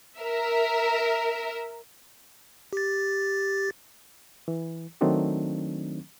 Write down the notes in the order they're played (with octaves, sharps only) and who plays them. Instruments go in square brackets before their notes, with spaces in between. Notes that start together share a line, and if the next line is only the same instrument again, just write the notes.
[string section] A#4 E5
[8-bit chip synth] G4 A6
[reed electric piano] E3
D#3 F#3 A3 C4 D4 D#4